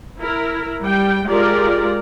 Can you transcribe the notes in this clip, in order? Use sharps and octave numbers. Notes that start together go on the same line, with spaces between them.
E4 A#4
G3 G5
G#3 F4 G4 A#4 D5